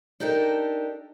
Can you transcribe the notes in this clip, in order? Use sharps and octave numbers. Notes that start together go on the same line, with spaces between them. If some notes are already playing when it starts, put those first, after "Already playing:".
D4 D#4 G4 A4 A#4